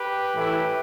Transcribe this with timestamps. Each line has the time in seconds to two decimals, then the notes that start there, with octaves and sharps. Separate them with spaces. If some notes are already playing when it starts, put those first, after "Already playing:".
Already playing: G4 B4
0.35 A2 E3 A3 E4